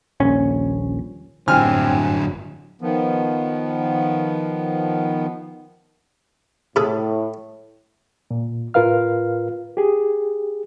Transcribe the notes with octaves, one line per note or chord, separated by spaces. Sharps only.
D#1 A#1 C#4
G1 F#2 A2 D3 F#3 C4 G#5 F6
D#3 F3 B3
A2 C3 G#4 A4
A#2
A2 F4 A#4 B4 F5 F6
G4 G#4